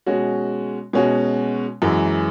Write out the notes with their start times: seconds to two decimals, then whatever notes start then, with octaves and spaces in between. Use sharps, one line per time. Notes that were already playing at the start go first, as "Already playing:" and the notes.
0.06 B2 G#3 C#4 F#4
0.93 B2 G#3 C#4 F#4
1.82 F#2 E3 G#3